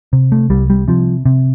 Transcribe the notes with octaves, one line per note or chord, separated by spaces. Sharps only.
C3
A3
C2 G3
G3
C3 F3
C3